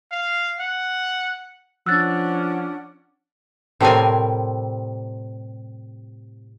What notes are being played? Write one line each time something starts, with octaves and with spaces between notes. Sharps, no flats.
F5
F#5
F3 C#4 D4 F#5 E6 F#6 A6
A2 C3 G3 C4 A#4 G#5